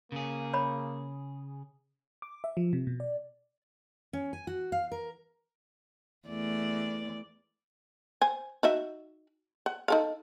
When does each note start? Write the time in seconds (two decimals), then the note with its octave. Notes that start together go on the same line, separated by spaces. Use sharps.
0.12 C#3 A#3 G#4
0.53 C#5 B5
2.22 D6
2.44 E5
2.57 F3
2.73 C3
2.87 B2
3.00 D5
4.13 C#4
4.33 G#5
4.47 F#4
4.72 F5
4.92 A#4
6.28 E2 A3 D5
8.21 C5 G#5
8.63 D#4 F#4 E5
9.66 F#5
9.88 D#4 A4 F5